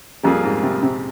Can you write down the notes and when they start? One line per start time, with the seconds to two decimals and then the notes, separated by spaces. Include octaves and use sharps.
0.23 F2 G3 A#3 F4 G#4
0.44 G#2
0.63 C3
0.82 C3